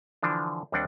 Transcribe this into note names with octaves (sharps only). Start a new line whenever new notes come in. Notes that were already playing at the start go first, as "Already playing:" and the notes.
D3 E3 F3 D4
D#2 G3 C4 D4 F#5 G5